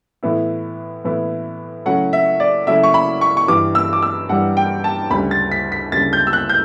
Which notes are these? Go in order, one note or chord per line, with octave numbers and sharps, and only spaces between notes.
A2 E3 B3 E4
A2 E3 B3 E4
C#3 F#3 A3 C#4 E4 F#5
E5
D5
C#3 F#3 A3 C#4 E4 E5
C#6
B5
C#6
C#6
G2 E3 G3 D6
E6
D6
E6
G2 E3 G3 F#5
G5
A5
D2 C#3 G3 B5
A6
B6
B6
D2 C#3 G3 A6
G6
E6
F#6
G6